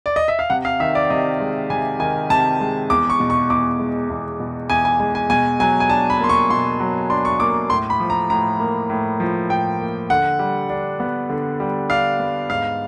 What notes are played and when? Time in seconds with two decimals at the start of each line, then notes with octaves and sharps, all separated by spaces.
0.06 D5
0.16 D#5
0.28 E5
0.39 F5
0.50 C3 F#5
0.65 F5
0.80 D#3 E5
0.95 D5
1.10 C3 D#5
1.40 G#3
1.70 C3 G#5
2.00 D#3 G#5
2.30 C3 A5
2.60 G#3
2.90 E2 D6
3.10 C#6
3.20 B2
3.30 C#6
3.50 E2 D6
3.80 G#3
4.10 E2
4.40 B2
4.70 E2 G#5
4.85 G#5
5.00 G#3 G#5
5.15 G#5
5.30 B2 G#5
5.60 F#3 G#5
5.80 G#5
5.90 D4 A5
6.10 B5
6.20 A#3 C6
6.29 C#6
6.50 B2 C6
6.80 F#3
7.10 D4 C6
7.25 C#6
7.40 A#3 D6
7.70 A2 C6
7.90 B5
8.00 F3
8.10 A#5
8.30 A2 A#5
8.60 A#3
8.90 A2
9.20 F3
9.50 A2 G5
9.80 A#3
10.10 D3 F#5
10.39 G3
10.70 D4
11.00 B3
11.30 D3
11.60 G3
11.90 D4 F5
12.19 B3
12.50 G#2 F5